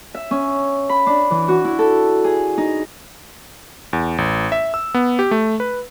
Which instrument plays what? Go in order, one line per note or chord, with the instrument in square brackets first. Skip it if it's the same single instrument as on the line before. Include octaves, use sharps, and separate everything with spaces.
[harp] E5
C#4
B5
D4
E3
F#4
E4
A4
G#4
D#4
[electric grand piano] E2
A1
E5
E6
B3
G4
A3
B4